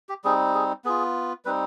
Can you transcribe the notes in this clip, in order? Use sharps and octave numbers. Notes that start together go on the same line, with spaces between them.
G4
G3 C4 D#4 G#4
G#4
B3 F4 G#4
G3 C4 D#4 B4